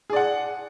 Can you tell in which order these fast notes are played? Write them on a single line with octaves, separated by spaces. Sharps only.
G#4 D5 F#5